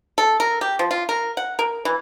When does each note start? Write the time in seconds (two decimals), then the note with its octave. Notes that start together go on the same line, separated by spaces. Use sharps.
0.18 A4
0.40 A#4
0.61 G4
0.79 F3
0.91 F4
1.09 A#4
1.37 F#5
1.59 A#4
1.85 E3